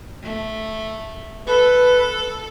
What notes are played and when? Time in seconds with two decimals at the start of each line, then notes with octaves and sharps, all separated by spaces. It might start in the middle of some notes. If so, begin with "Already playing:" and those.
0.24 A3
1.48 A4 B4